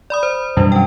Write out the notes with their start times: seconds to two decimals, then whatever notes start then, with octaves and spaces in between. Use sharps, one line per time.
0.10 D5 B5 D#6
0.23 C5
0.57 F#2 B2 E3 G3 D4
0.72 C#4 G5